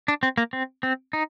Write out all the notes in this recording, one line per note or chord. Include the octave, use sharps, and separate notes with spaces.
D4
C4
A#3
C4
C4
D#4